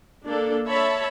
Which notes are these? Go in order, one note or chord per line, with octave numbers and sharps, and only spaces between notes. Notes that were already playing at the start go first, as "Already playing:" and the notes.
A#3 D4 A4
C#5 E5 A5 B5